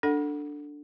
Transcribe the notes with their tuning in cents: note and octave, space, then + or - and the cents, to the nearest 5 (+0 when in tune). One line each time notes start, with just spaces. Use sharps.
D4 +0 A4 +10 F#5 +0